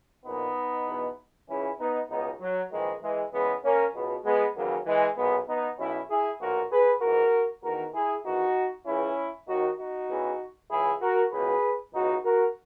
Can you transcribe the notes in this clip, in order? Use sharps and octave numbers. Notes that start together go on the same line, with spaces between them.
A#1 A#2 B3 D#4
E2 B2
C#2 C#3 E3 C#4 E4
B3 D#4
C#2 B2 B3 D#4
F#3
A#1 G#2 D#3 E3 G#3
E3 G#3
E2 C#3 E3 G#3 B3
A#3 C#4
C#2 B2
G#3 B3
D#2 C#3 E3 F#3 A#3
E3 G#3
B1 A#2 G#3 B3
B3 D#4
B1 B2 C#4 E4
E4 G#4
B1 A#2 F#4 A#4
G#4 B4
A#1 G#2 E3 F#4 A#4
E2 D#3 F#4 A#4
E4 G#4
E2 D#3 D#4 F#4
C#2 C#3 E3 C#4 E4
D#2 D#3 D#4 F#4
D#4 F#4
E2 C#3 E3
C#2 C#3 E3 E4 G#4
F#4 A#4
C#2 B2 G#4 B4
C#2 B2 D#4 F#4
F#4 A#4